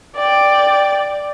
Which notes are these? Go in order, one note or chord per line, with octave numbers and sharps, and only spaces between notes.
D5 G5